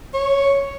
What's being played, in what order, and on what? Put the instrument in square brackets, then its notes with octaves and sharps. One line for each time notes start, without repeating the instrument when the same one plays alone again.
[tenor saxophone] C#5